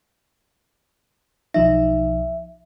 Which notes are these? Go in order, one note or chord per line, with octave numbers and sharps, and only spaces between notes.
B1 F3 D#4 E5